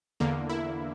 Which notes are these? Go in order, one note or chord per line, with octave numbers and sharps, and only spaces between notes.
E2 D3 A#3
E4